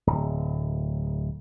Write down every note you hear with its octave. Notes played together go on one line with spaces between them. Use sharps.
D1